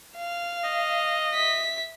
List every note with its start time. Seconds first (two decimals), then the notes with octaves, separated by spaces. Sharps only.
0.17 F5
0.64 D#5
1.34 E5 B6